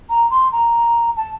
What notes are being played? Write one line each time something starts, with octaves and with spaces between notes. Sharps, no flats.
A#5
C6
A#5
A5